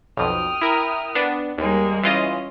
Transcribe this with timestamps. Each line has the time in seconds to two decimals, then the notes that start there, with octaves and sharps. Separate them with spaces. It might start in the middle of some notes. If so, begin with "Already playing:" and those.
0.17 B1 F2 G5 D#6 F6
0.62 E4 A#4
1.15 B3 D4
1.58 D#2 G3 G#3 A#3
2.03 E3 C#4 F4 D#5